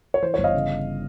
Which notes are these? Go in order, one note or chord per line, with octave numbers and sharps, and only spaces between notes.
C#5
E3 C5
G1 C#5
D#5 F5
C#3